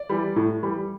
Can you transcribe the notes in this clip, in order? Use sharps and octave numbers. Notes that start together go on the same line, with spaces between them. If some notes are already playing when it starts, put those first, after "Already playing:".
Already playing: D5
E3 G3
A2
E3 G3